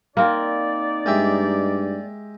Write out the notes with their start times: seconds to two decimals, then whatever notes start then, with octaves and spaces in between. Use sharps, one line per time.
0.17 A#3 C4 D#4 D5
1.06 G2 G#3 G4 E5